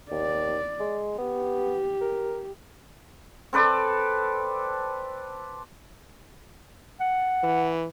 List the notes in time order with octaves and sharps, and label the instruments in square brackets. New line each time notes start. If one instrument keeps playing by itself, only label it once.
[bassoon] D#2 [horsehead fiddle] D5
[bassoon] G#3
[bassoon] B3 [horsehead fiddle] G4
[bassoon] A#4
[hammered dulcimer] C4 A4 B4 D5
[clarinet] F#5
[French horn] E3